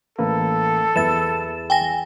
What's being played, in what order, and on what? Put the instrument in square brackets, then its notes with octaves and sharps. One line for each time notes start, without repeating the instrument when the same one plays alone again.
[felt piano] A1 [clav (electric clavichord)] A#3 B4 [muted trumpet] A4
[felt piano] E2 [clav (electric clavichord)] B4 E5 [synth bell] A6 E7
[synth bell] G5 G#5 A#6